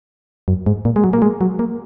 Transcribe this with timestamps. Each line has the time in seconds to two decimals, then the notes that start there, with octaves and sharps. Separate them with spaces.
0.48 F#2
0.66 G#2
0.85 A#2
0.96 G#3
1.04 F#3
1.13 A#3
1.22 G#3
1.41 F#3
1.59 A#3